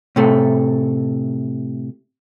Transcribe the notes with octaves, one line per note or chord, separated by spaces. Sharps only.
A2 C3 A3